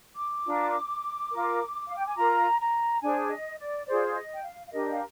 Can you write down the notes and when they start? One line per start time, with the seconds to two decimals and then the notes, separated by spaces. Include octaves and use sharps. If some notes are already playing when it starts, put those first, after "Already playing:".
0.17 D6
0.46 D4 F4 A#4
1.31 F4 A#4
1.87 F5
1.97 G5
2.07 G#5
2.16 F4 A#4 A#5
2.59 A#5
3.01 D4 G#4 C5 G#5
3.30 D#5
3.59 D5
3.87 F4 G#4 C5 D5
4.07 D5
4.15 D#5
4.34 G5
4.43 F5
4.67 F5
4.72 D4 G4 A#4 D#5
4.91 F5